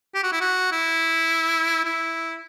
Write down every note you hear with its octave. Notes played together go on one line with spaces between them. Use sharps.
G4
F#4
E4
F#4
E4
E4